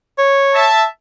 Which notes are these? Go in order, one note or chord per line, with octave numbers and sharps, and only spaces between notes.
C#5
E5 A5